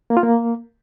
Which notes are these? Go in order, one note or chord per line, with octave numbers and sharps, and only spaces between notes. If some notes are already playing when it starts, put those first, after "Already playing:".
A#3
F4
A#3